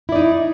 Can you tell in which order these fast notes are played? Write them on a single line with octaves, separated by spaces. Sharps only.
E4 D5 D#4